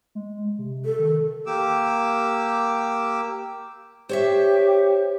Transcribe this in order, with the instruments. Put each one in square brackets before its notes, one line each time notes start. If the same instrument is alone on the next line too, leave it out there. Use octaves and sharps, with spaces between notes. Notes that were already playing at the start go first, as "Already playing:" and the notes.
[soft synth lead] G#3
C3
[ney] A4
[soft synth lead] D#3
[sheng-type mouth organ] A#3 G4 D6 E6
[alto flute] G4 [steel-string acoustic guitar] C5 C#5 E5